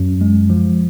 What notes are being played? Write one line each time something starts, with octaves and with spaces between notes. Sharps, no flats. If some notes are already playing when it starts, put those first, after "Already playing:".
Already playing: F#2
G#3
F3